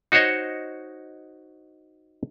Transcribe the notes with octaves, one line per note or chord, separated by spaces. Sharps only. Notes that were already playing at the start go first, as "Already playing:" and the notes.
D#4 F#4 C5 C#5 D#5